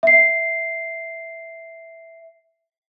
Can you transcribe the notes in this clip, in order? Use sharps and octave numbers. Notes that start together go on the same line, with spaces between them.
E5 C7